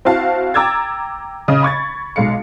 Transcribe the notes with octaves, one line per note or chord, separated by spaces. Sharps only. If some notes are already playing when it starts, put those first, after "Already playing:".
C4 E4 F#4 F5 A5
G5 A#5 D6 E6 G#6 A6
C#3 D#5 D#6
B5 C#6 G#6 A6
B1 G#3 F5 C#7